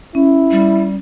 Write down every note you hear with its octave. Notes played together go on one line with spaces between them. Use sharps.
C#4 E4
G3